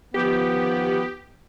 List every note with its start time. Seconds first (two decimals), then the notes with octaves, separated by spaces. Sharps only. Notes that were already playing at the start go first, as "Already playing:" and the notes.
0.14 D#3 F3 B3 G4